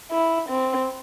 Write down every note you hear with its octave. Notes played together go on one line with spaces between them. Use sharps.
E4
C4